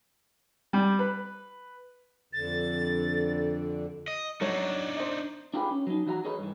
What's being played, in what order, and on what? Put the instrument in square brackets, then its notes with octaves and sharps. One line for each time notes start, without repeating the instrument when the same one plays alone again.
[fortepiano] G3
B4
[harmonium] F2 D3 [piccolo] A6
[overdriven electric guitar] D#5
[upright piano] F#3 C#5 [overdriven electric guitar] D4 D#4
[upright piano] C5 D#5
[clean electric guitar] D4 F4 G4 G#4 B4
C#4
F#3 D#4
E3 F#4 E5 A#5
G#4 A4 B4 C#5 D#5
G2 E3